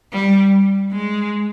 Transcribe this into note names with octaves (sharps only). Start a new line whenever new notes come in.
G3
G#3